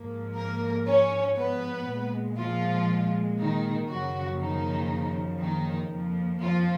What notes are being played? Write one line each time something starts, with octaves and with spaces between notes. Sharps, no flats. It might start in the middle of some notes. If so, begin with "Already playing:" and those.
Already playing: G#2 F3 A#3
A#3 A#4
C#4 C#5
B3 B4
A#2 G#3
F3 F4
D#3 D#4
F#2 C#3 F3 F#3 A#3 F#4
D#3 D#4
D#3 D#4
F2 F3 A#3
F3 F4